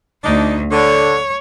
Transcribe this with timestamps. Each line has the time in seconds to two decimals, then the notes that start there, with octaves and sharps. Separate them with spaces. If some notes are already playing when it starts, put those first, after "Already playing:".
0.24 D2 D4 D#4
0.72 D3 C#5